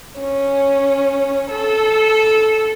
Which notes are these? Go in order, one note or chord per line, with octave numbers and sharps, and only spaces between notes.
C#4
A4